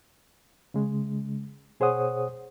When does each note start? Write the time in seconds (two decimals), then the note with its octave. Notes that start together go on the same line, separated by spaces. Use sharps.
0.74 C#3 G#3
1.80 B2 G#4 C5 C#5 F#5 D#6